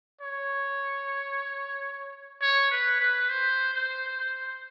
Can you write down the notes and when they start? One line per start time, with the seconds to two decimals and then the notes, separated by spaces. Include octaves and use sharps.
0.22 C#5
2.42 C#5
2.71 B4
3.00 B4
3.30 C5
3.74 C5
4.18 C5